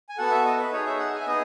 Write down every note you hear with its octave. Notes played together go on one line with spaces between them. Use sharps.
G#5
B3 F#4 A4 F#5
E5
D#5
B4
D#4 G#4 C#5
E5
F#5
G#5
E5
B3 D#4 G#4 D#5